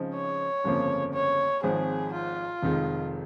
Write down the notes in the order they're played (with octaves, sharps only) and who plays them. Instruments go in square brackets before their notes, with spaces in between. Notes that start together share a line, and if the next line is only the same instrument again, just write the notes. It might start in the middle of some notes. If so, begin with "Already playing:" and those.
Already playing: [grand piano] C#3 F3 G#3 C4 D#4
[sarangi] C#5
[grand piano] G1 F2 C#3 F3 A#3
[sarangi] C#5
[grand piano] G#1 G#2 F3 C4 [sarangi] G#4
[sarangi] F4
[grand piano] F1 F2 D#3 G#3